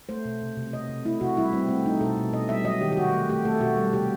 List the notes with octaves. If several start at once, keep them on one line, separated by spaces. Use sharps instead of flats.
A3 C5
B2
C3
C3
C3 D#5
C3
A3 E4
C3 F#4
G3 E4
G3 C4
A3 C4
A3 D#4
B2 A4
B2
B2 D#5
G3 E5
F#3 D#5
D#3 G4
G4
C3 F#4
A3
A3 G4
A3 A4
B2 F#4
G3
C3 G4